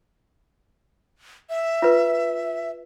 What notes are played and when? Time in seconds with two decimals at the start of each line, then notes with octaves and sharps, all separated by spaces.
1.50 E5
1.82 F4 B4